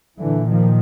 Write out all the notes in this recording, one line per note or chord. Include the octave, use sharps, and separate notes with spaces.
A#2 D3 E3
D#3 F3